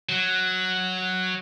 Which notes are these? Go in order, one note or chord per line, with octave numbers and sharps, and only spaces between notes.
F#3